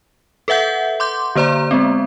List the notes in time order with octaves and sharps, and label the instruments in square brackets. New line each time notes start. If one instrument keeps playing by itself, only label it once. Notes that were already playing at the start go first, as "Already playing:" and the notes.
[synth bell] A4 B4 E5 F#5 G6
C6 D6 G6
D3 A#3 C5 D5 A#5
G#3 B3 C4